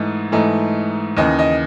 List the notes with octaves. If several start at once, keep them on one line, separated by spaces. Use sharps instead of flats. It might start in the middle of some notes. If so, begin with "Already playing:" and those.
Already playing: G#2 E3 A3 D#4
G#2 E3 A3 D#4
D#2 C#3 E3 D#5
D#5